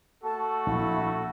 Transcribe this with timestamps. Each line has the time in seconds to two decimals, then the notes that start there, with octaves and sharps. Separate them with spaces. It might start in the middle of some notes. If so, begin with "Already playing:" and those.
0.24 A3 F#4 A4 A5
0.67 A#1 E4